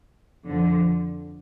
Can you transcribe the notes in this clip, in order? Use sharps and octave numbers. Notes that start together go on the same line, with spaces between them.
F2 D3 F3